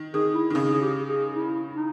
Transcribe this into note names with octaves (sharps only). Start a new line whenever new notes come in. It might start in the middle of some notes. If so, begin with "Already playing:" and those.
Already playing: D#3
D#3 G#4
E4
D#3
C#3 G#4
G#4
G4
G#4
E4
D#4